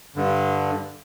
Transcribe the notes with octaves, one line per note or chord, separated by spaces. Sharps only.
G2 D3